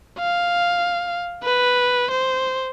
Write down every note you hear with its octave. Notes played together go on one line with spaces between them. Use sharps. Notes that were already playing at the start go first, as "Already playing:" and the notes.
F5
B4
C5